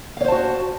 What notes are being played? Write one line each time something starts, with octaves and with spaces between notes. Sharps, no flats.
F#4 C5 C#5 F5 A5